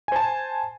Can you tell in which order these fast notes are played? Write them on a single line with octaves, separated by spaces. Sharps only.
G#5 C5 A5